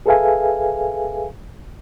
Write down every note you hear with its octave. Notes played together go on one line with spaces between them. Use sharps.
G#4 A4 B4 E5 F5 G#5